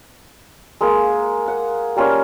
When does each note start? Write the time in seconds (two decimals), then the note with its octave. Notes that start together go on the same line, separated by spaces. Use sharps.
0.81 G#3 A#3 G#4
1.48 F#5
1.96 G3 A#3 C#4 F4